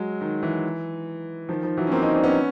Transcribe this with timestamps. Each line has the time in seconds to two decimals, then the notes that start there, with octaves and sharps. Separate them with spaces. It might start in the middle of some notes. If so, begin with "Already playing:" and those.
Already playing: F#3 G#3
0.21 D#3
0.43 E3
1.49 D#3 F3
1.63 D#3 F3
1.77 E3 F#3
1.87 C#4
1.91 A#3 C4
2.02 C#4 D#4
2.13 C4 D4
2.24 B3 C#4